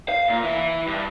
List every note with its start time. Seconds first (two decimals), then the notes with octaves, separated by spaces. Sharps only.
0.09 F5
0.30 A#2
0.43 E3
0.87 G2